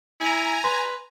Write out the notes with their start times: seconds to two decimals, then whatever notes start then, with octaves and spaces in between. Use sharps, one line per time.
0.20 E4 G#5 A#5
0.64 B4 C6